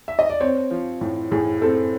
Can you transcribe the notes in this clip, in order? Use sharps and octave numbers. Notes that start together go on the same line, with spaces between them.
E5
D#5
D5
C4 C#5
F3
A2
A2 G#4
C4 A4